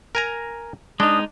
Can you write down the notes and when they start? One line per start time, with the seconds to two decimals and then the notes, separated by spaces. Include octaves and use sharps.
0.15 A#4 G#5 A#5
1.00 G#3 D4 D#4 D#6